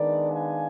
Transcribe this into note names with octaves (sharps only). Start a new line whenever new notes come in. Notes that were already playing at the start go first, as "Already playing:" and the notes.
Already playing: D#3 G#3 B3 D4 A#4 D5
F5 G#5